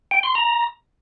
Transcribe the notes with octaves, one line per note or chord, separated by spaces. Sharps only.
G5
C6
A#5